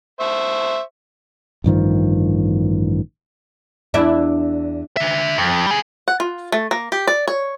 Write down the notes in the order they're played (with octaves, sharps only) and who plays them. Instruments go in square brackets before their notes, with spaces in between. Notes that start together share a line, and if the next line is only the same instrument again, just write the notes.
[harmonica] C5 E5 C#6
[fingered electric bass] A1 G2 D#3 F3
[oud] E2 D4 E4
[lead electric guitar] D4 E5
F2
G3 G#4
[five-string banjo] F#5
F4
A3
A#3
G4
D5
C#5